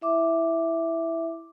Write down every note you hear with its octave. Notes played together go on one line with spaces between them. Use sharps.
E4 E5 D6